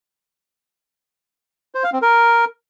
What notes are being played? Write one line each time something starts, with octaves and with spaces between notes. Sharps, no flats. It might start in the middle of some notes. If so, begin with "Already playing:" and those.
C5
F5
C4
A#4